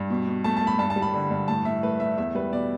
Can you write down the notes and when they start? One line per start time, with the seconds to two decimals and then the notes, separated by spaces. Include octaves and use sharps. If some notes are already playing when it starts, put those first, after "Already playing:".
Already playing: G2
0.10 B2
0.28 B2
0.44 A3 A5
0.57 A3 A5
0.67 B5
0.79 G2 A5
0.90 A5
0.96 G3
1.02 B5
1.14 D3
1.31 G2
1.48 A2 A5
1.65 A2 E5
1.83 A3 B4
2.00 A3 E5
2.17 E2 E5
2.35 G3 B4
2.52 B2 D5